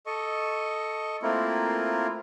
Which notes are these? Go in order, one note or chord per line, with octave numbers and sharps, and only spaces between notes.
A4 D#5 C#6
A3 A#3 C4 E4 F4 A#4